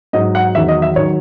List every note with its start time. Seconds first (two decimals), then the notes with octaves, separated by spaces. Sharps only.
0.13 G#2 F#3 D#5
0.35 F#5
0.55 E2 D#3 F#3 E5
0.68 D#5
0.82 E5
0.96 D#3 F#3 C#5